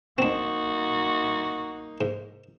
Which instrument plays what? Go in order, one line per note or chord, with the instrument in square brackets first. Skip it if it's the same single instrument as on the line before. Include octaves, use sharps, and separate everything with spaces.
[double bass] A#3 D#4 [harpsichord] C4 D4 [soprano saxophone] F#4
[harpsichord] G#2